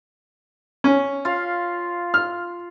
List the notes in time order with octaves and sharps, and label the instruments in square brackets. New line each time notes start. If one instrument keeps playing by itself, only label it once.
[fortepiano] C#4
[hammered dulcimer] F4 F5
[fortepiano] F6